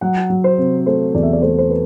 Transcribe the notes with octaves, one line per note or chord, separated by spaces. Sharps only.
F#3 F#5
F#3
C5
C3
A3 C5
E2 D5
E5
D5
A3 C5
C5
B4